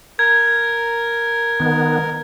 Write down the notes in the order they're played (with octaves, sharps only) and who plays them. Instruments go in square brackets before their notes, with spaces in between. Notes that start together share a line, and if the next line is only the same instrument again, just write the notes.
[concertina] A#4 [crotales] G#6
[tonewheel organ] D#3 B3